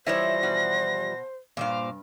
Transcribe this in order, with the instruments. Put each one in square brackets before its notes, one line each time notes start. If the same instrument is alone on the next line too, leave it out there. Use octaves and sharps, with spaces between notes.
[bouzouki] E3 F3 G3 [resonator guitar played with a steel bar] E4 C#5 E5 [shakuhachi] C5 [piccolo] A#6
[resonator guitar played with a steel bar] B2 F#4
[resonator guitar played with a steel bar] E2 G2 [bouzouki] A#2 C5 F5 [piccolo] D6